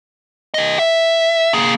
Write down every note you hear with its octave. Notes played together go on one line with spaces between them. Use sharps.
G4 D#5
E5
A#3 G#4